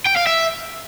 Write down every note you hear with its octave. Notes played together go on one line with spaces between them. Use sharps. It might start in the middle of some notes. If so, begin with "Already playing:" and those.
G5
F5
E5